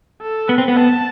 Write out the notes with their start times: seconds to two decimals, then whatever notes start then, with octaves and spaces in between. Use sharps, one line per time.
0.22 A4
0.49 B3 B4
0.58 C4
0.68 B3
0.77 A5